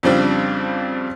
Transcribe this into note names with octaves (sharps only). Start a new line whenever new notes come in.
F2 C#3 F3 G3 C4 D4